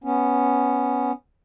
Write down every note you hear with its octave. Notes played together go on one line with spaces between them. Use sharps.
B3 C#4